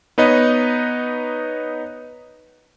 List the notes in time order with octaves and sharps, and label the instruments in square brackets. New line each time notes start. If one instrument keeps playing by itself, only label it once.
[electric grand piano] B3 D#4 B4 C#5 D#5